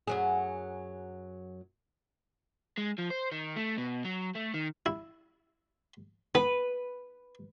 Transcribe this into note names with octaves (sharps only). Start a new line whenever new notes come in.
F#2 F#3 G#4
G#3
F3
C5
D#3
A3
B2
F#3
A3
D#3
E4
B3 B4